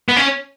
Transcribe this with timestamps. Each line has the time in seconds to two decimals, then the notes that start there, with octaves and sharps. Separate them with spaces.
0.09 B3
0.16 C#4